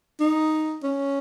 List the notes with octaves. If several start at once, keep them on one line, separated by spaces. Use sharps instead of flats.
D#4
C#4